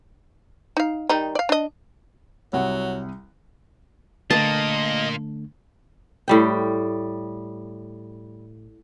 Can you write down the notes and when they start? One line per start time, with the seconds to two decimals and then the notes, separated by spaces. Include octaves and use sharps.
0.77 D#4 F5
1.09 D#3 G3 D#4
1.35 D5 F5
1.49 D4 D#5
2.53 C2 F#3 F#5
4.31 D3 A3 A#3 D4 F4 D#5 A5
6.28 A2 G3 G5